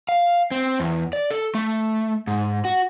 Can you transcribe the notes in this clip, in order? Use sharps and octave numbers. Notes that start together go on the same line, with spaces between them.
F5
C4
E2
D5
A4
A3
G#2
F#4